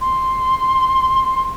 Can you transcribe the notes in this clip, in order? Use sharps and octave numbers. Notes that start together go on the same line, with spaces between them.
C6